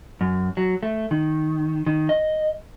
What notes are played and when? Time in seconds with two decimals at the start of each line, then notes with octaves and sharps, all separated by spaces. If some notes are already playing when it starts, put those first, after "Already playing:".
0.21 F#2
0.57 F#3
0.83 A3
1.11 D#3
1.86 D#3
2.09 D#5